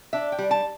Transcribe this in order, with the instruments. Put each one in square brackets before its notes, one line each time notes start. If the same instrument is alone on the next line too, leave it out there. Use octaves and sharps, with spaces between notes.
[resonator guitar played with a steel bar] D4 E5
G5
G3
A5